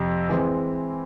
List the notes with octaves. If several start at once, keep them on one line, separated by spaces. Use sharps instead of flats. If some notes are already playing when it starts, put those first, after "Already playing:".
Already playing: F2 C3
E3 G#3 C4